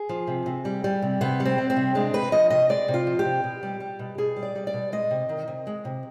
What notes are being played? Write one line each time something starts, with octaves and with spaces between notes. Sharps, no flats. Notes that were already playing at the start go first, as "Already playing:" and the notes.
Already playing: G#4
F3
C3
C3
G3
G3
C3
C3 B3
G3
C4
G3
C4
C3
G#3 D4
C3 B4
F3 D#5
C3 D#5
G#3 D5
C3
F4
F3
G4
C3
B2
G3
G3
B2
B2 G#4
G3
D5
G3
D5
B2
G#3 D#5
C3
D#3
C3
G#3
C3